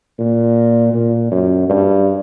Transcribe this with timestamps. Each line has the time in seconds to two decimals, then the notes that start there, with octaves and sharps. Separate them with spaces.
0.19 A#2
0.94 A#2
1.32 F#2
1.70 G2